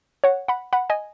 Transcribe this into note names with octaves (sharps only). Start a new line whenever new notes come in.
C#5 F#5
F#5 B5
F#5 B5
D#5 G#5